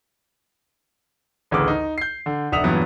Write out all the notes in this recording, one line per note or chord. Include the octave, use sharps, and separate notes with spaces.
A1 D2 C#3 D6
D#4
G6 C7
D3
F1 D4 E5 F#5 D#6 F7
E2 G2 A#2 F#3 B3